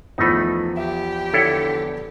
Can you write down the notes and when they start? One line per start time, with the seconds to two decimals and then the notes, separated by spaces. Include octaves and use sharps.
0.18 E2 F3 A3 D#4 B5
0.77 G4 E5
1.34 D3 E4 A4 C#5